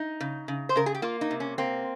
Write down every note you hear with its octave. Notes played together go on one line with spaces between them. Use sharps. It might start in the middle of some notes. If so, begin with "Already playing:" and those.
Already playing: D#4
C#3
C#3
C5
C#3 A#4
G#4
G4
A#3 F4
D#4
C3
C#4
A#3 C4